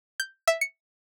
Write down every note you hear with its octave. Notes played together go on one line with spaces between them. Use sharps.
G6
E5
C#7